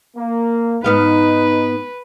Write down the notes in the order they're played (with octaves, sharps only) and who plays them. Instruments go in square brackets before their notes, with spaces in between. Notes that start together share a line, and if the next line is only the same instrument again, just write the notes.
[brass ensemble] A#3
[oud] G#2 B3 F5 [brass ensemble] D#4 [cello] B4